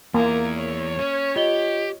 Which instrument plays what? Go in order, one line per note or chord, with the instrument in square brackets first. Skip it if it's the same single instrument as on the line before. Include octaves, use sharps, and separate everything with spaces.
[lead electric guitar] E2 E4 [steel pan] A#3 [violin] A#5 G#6
[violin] C#5
[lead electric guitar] C#4
[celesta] F4 D#5 G7 [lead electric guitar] G4